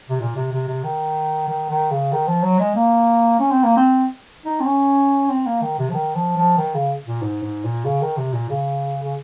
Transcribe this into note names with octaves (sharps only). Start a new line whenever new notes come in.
C3
A#2
C3
C3
C3
D#3
D#3
D#3
C#3
D#3
F3
F#3
G#3
A#3
C#4
C4
A#3
C4
D#4
C4
C#4
C4
A#3
D#3
C3
F3
D#3
F3
F3
D#3
C#3
A#2
G#2
G#2
A#2
C#3
D#3
C3
A#2
C#3
C#3